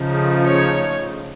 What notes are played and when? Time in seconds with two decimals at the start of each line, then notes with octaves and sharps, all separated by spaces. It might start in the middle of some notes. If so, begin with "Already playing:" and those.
Already playing: C#3 F3 A3 D#4
0.45 C#5